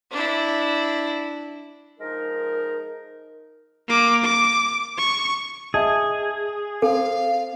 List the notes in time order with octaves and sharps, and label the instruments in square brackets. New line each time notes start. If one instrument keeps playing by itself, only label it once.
[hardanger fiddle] D4 E4
[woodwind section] F3 G#3 D#4 A#4
[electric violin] A#3 D6
D6
C#6
[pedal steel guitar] G#4 [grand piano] D#5 E5 A5
[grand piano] C4 [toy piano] A4 [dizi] F5